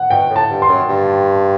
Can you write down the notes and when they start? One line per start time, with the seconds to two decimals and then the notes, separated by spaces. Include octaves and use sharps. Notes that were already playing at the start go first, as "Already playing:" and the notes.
Already playing: F#5
0.10 B2 G5
0.30 A2
0.36 A5
0.49 G2
0.62 C6
0.68 F#2
0.89 G2